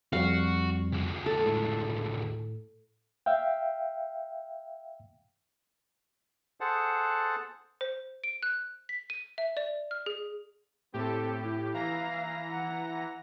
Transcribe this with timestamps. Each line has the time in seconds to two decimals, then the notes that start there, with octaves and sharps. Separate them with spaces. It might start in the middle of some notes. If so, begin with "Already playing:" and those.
0.13 F2 G3 F#4 F5
0.92 D2 G#3
1.26 A4
1.46 A2
3.26 E5 F5 G5
6.60 G#4 A4 C5 F#5 A5
7.81 C5
8.24 D7
8.43 F#6
8.89 B6
9.10 D#7
9.38 E5
9.57 D5
9.91 F6
10.06 G#4
10.94 A2 C4 G4 A4
11.41 E4
11.74 E3 F5 A#5 A#6
12.51 F#5